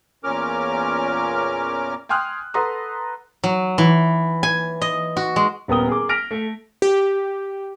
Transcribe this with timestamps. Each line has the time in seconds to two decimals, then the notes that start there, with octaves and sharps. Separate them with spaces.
0.24 E2 A#2 C#4 A#4 D6 F6
2.09 G5 G#5 C6 D#6 F6 F#6
2.54 A4 B4 F#5 A#5 C6 D#6
3.44 F#3
3.78 E3
4.43 G#5
4.81 D#5
5.17 F#4
5.36 G#3
5.68 D#1 B3 A#4 G5 D#6 G7
5.88 G#4 A#4 D6
6.09 F6 A#6 B6 D7 F7
6.31 A3 A4
6.82 G4